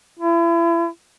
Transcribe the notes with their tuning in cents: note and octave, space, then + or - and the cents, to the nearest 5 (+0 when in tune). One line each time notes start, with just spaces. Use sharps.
E4 +35